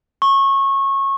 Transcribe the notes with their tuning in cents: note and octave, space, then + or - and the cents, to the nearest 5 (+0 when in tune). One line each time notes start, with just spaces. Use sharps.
C#6 -20